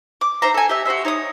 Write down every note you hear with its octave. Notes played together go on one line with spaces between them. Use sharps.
D6
D#4 C5 E5 A#5
A4 G#5
G4 E5
F#4 G4 C5 E5
D#4 C#5 C6 D#6